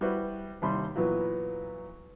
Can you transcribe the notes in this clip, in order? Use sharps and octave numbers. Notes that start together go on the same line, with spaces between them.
G3 E4 F#4 B4 C5
D#2 C3 G3 B5 C6
A#2 E3 F#3 B3